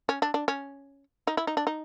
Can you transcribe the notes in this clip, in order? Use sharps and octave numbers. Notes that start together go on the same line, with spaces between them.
C#4
D4
D4
C#4
D#4
E4
D#4
D4
D#4